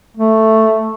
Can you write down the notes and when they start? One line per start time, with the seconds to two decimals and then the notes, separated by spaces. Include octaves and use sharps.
0.17 A3